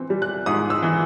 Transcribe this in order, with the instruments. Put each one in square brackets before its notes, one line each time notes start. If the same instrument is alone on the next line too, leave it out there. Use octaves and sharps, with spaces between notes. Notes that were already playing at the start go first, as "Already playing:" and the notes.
Already playing: [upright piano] E3 C4
G3
F#6
G#2 D#6
E6
E3